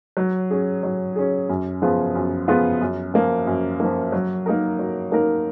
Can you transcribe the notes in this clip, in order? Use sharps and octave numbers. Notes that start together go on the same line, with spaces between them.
F#3
C#4 G#4
F#3
C#4 G#4
F#2
F3 B3 F4 G#4
F#2
F3 B3 F4 G#4
F#2
F3 A#3
F#2
F3 A#3
F#3
A#3 D#4 A#4
F#3
A#3 D#4 A#4